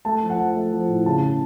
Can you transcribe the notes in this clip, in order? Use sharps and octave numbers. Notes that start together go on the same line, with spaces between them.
A3 A5
F3
F#5
F3
A3
F3
A2
C#3 A5
C#3